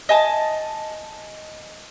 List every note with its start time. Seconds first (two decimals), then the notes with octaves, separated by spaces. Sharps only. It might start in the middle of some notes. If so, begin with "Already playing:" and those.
0.09 D#5 G#5 A5